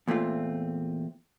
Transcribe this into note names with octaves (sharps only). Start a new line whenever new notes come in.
E2 A#2 A3 C4 F4